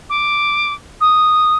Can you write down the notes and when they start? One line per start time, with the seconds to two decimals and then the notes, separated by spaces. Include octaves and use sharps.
0.09 D6
1.00 D#6